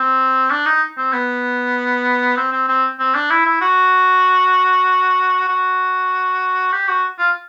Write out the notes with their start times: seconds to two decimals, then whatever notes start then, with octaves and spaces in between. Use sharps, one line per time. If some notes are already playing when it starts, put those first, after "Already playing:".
Already playing: C4
0.51 D4
0.66 D#4
0.97 C4
1.13 B3
2.37 C4
2.52 C4
2.69 C4
2.99 C4
3.14 D4
3.30 E4
3.46 E4
3.61 F#4
5.48 F#4
6.72 G4
6.88 F#4
7.18 F4